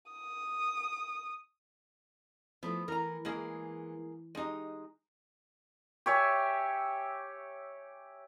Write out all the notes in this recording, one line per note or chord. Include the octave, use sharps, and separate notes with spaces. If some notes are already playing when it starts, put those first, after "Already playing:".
D#6
F3 A3 B3 E4
E3 A#4 A#5
E3 G#3 A#3 G#4
G#3 D#4 G4 D#5
G4 C#5 E5 G#5